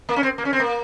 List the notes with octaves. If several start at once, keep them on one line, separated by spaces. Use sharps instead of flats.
A#3
C#4
C4
A#3
C#4
C4
A#3